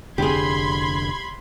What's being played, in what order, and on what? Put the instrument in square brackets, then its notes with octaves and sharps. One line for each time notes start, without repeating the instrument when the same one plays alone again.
[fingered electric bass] F1 D3 [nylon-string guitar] G4 G#4 [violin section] B5 C6 G#6